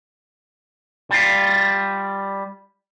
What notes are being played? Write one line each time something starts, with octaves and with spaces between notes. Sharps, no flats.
G3 F4